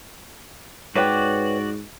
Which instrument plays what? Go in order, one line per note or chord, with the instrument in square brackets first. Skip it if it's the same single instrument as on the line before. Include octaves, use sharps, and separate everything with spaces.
[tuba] G#2 [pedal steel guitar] F#4 D5 [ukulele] B4 C#5 G5